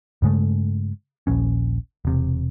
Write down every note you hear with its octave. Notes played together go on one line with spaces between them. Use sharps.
G2 C#3 G#3 A3
D#1 A#1 C#4
E1 C3